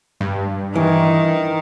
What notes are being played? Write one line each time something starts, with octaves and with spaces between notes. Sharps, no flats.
G2
D#3 E3